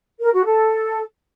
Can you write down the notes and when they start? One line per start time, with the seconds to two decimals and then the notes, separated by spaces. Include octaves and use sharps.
0.21 A#4
0.33 F#4
0.45 A4